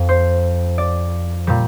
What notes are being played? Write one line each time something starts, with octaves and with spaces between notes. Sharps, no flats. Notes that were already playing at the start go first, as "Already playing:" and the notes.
Already playing: F2
C5
D5
A#2 G3